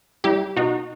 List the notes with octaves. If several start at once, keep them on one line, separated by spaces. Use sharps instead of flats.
G3 E4 G4
B2 D#4 F#4